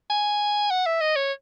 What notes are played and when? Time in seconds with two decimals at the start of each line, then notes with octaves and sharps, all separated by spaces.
0.10 G#5
0.71 F#5
0.86 E5
1.01 D#5
1.16 C#5